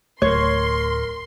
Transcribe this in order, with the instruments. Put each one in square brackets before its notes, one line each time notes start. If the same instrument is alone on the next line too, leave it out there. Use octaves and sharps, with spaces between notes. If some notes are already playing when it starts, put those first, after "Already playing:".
[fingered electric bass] D1 A3 [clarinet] A#4 [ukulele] C#5 [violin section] C6